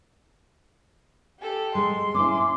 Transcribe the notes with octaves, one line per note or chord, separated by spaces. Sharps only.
G4 A4
G#3 C6
C#4 E4 D6